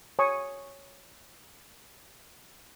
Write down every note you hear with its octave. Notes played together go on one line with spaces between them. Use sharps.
C#5 G#5 C#6 D#6